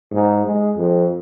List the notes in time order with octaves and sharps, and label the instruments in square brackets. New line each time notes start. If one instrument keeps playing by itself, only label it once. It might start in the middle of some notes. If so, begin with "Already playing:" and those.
[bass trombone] G#2
G#3
F2